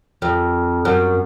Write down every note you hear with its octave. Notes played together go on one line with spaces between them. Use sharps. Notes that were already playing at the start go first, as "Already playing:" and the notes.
F2
F#2